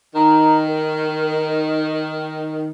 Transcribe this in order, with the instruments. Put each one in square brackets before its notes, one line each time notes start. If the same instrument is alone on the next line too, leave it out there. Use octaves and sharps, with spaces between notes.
[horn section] D#3 [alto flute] A#5
[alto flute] A#4